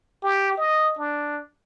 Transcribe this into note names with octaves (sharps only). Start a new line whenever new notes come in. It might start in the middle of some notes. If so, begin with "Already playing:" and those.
G4
D#5
D4